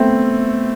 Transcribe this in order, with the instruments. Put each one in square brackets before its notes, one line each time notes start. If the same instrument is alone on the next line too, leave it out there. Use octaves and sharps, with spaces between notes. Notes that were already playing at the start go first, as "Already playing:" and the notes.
Already playing: [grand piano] A3 B3 C4